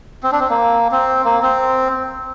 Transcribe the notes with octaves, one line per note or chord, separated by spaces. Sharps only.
C4
D4
C4
A#3
C4
A#3
C4